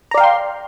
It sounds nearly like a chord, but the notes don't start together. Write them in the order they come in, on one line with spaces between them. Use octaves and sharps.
A#5 D5 F5 G5 C6